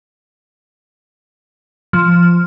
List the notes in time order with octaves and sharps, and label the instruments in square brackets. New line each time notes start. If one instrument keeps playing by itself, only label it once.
[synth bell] F3